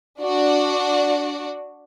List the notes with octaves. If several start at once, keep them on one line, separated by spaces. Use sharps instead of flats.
D4 F#4 D5